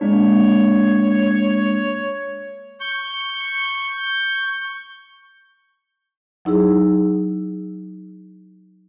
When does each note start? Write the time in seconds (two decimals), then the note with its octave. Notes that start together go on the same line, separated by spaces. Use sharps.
0.01 G#3 A#3 D4 C#5
2.81 C#6 G6
6.45 F#3 D#4 E4 G#4